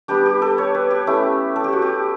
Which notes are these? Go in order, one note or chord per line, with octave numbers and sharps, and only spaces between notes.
G3 B3 D4 G4
G4
A4
C#5
B4
G4
A3 C#4 E4
A4
G4
F#4
G4